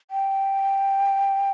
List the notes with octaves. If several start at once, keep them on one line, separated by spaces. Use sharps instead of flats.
G5